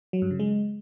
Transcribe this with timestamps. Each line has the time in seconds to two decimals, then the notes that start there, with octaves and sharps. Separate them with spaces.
0.13 F#3
0.22 G2
0.31 C#3
0.39 G#3